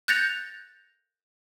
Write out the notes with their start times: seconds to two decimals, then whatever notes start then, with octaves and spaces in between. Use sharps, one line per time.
0.08 F#6 G6 A6 A#6 C#7 F7